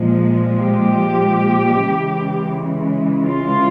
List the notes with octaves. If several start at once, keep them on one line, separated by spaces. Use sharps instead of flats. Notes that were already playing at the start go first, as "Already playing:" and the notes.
Already playing: A#2 F3 G#3
G4
C#3 E3 G#3
F4